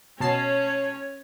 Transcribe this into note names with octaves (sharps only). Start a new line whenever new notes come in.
B2 C#4 C#5 A5 C7